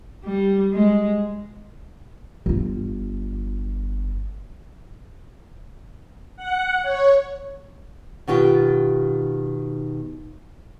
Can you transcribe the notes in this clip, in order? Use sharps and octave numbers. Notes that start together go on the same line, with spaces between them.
G3
G#3
G1 F4
F#5
C#5
B2 D#3 F4 G4